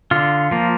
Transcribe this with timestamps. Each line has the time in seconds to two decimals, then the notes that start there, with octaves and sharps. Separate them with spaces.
0.11 D3 F4
0.51 F3 A#3